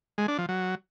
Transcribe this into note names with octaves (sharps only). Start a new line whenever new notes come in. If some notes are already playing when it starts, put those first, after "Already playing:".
G#3
D4
F3
F#3